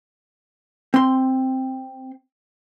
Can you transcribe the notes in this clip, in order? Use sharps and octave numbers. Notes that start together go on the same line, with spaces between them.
C4 C6